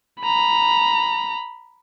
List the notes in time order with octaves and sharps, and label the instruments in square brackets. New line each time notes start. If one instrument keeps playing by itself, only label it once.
[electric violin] A#5 B5